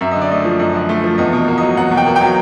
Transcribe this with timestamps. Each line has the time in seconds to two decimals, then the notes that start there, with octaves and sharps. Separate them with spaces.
0.01 F#2 E5
0.11 D3 D#5
0.22 D5
0.31 A3 D#5
0.45 F3
0.59 F#2 D#5
0.74 D3
0.89 A3
1.04 F3
1.18 E2 D#5
1.33 B2
1.48 A#3
1.58 D#5
1.62 F#3
1.77 E2 F#5
1.91 B2
1.97 G5
2.06 A#3
2.16 G5
2.21 F#3